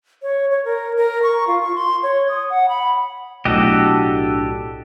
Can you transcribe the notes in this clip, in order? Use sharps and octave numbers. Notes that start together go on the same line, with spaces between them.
C#5
C#5
A#4
A#4
C#6
F4
C#6
C6
C#5
D#6
F#5
B5
B1 A2 D4 F#4 G4 A4 D#5